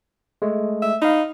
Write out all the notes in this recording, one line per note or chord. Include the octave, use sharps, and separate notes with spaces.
G#3 A3
E5
D#4 F5 B5